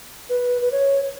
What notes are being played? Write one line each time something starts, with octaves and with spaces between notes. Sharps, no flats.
B4
B4
C#5